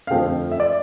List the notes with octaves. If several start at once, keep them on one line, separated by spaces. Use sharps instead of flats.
F5
F2 D3 F3 A3 G5
E5
D5